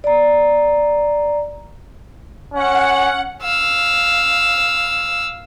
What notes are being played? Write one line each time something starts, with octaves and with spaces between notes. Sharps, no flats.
D5 A#5
C#4 F#5
F5 E6